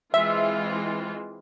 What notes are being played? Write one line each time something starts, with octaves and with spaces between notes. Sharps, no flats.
E3 G#3 C4 F4 E5